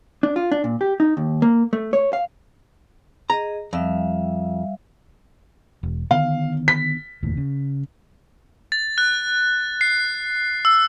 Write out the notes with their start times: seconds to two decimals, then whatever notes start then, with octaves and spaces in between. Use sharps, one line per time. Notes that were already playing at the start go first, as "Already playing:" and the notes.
0.23 D4
0.36 F4
0.52 D4
0.64 A#2
0.81 G4
1.00 D#4
1.17 D#2
1.42 A#3
1.73 A3
1.93 C#5
2.13 F5
3.30 G#4 D#5 A#5
3.73 F2 G3 E5 F5
5.83 E1
6.11 D3 D#3 B3 F5
6.68 B6
7.23 F1 D#2 A2
7.37 C#3
8.72 A6
8.98 F#6
9.81 C7
10.65 E6